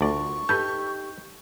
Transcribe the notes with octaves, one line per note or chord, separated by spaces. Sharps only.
D2 F4 F#4 A#4 D5 C#6
D#4 G4 A4 B4 G6